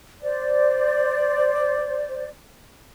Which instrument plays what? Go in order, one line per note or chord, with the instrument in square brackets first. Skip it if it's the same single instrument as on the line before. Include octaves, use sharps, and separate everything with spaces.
[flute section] C5 D5